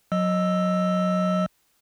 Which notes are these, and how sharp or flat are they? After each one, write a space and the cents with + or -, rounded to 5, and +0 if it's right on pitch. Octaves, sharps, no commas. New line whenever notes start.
F#3 -20 D#5 +0 E6 +0